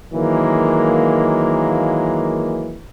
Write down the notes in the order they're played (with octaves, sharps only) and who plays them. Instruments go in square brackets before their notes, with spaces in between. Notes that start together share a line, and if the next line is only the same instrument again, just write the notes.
[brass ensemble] D#3 E3 F#3 G#3 A#3